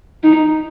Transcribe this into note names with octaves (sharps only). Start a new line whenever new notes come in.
D#4